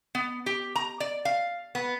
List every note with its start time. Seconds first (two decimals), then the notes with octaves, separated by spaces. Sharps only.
0.15 B3
0.46 G4
0.76 A#5
1.00 D5
1.25 F5
1.75 B3